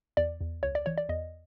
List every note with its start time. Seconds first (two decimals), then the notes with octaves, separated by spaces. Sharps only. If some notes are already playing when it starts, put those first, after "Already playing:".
0.17 E2 D5
0.41 E2
0.63 C#2 C#5
0.75 D5
0.86 E3 C#5
0.98 D5
1.09 E2 D#5